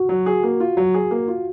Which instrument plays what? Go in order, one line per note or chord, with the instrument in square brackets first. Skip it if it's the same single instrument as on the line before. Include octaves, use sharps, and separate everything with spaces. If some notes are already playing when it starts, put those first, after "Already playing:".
Already playing: [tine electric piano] F#4
[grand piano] F#3
G#4
A#3
F4
F#3
G#4
A#3
F4